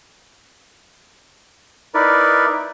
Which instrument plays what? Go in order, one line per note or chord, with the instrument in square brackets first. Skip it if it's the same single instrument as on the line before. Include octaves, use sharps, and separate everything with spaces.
[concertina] D#4 E4 A#4 B4 D5